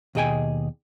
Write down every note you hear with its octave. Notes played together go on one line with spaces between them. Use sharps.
D#2 B2 G#4 D#5 G5 G#5